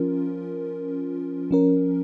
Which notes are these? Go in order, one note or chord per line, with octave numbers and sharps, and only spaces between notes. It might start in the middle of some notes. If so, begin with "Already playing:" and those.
Already playing: F3 C#4 F4 A#4
F3 C#4 A#4